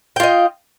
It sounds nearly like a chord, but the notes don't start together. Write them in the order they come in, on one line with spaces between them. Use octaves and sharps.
G5 F4 D#5